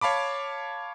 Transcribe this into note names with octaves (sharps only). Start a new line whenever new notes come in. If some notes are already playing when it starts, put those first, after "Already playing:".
C#5 F5 A5 B5 D6